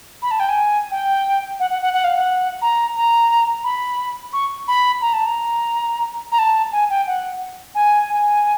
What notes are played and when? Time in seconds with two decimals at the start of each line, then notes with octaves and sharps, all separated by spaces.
0.22 B5
0.31 A5
0.40 G5
0.49 G#5
0.91 G5
1.60 F#5
1.70 F#5
1.82 F#5
1.94 F#5
2.04 F5
2.16 F#5
2.62 A#5
2.97 A#5
3.64 B5
4.33 C#6
4.68 B5
5.02 A#5
5.13 A5
5.26 A#5
6.32 A#5
6.39 A5
6.72 G#5
6.90 G5
7.07 F#5
7.75 G#5
8.09 G#5